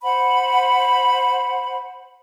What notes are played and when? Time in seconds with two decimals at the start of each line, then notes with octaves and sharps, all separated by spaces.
0.03 C5 F#5 B5